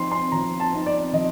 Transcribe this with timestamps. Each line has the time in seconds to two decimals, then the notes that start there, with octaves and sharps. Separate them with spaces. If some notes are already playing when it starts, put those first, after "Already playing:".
Already playing: F3 C4 D#4 C6
0.12 C6
0.32 F3 A#5
0.60 A5
0.73 C4 D#4
0.86 D5
1.13 F3 D#5